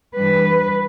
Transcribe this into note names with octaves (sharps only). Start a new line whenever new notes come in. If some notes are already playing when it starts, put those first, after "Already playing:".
G2 E3 G3 B4